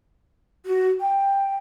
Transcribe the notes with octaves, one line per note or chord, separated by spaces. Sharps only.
F#4
G5